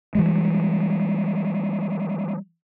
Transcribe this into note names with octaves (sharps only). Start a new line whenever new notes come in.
E3 G3 G#3